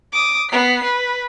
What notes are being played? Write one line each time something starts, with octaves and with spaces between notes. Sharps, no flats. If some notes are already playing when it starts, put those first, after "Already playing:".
D6 D#6
B3 C7
B4